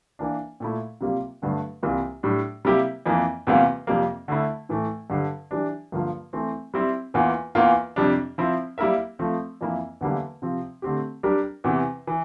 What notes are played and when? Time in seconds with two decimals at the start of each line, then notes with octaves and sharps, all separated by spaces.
0.19 E3 A#3 D4
0.60 A#2 A3 E4
1.01 C3 G3 A#3 F4
1.42 G2 D3 A3 D4
1.83 C2 C3 E3 A#3 F4
2.23 A2 G3 D4
2.65 C3 G3 A#3 E4 G4
3.06 F2 E3 A#3
3.47 E2 C3 G3 A#3 F4
3.87 F2 C3 G3 A#3
4.28 D3 A3 E4
4.69 A2 E3 A3
5.10 G2 D3 G3
5.51 E3 G3 D4
5.92 G2 D3 F3 A#3 F4
6.33 E3 A3 C4
6.74 G3 C4 E4
7.14 E2 E3 A#3 F4
7.55 E2 E3 A#3 F4
7.96 F2 C3 G3 D4
8.38 F3 C4 E4
8.78 G3 A#3 E4 A#4 E5
9.19 F3 A3 C4
9.61 F2 E3 A#3 E4
10.01 E2 D3 G3 A#3 E4
10.42 C3 F3 C4
10.82 D3 A3 C4 G4
11.23 G3 D4 G4 A#4
11.64 E2 C3 E3
12.07 E3